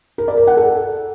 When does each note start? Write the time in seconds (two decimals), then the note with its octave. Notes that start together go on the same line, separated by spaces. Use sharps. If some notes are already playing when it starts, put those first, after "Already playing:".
0.18 A#4
0.28 D5
0.38 A#4
0.47 F#5
0.57 A4